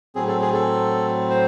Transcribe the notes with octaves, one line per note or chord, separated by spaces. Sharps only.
A2 F#3 C4 G#4
A4
G#4
A4
C5